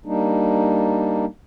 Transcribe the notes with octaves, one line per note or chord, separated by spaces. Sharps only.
G3 A#3 D4 D#4